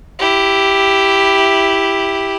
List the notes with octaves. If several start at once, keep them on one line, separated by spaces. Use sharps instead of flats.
E4 G4